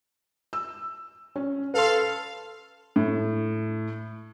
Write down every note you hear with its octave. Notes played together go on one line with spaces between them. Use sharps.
E6
C#4
A4 B4 F5 C6
A2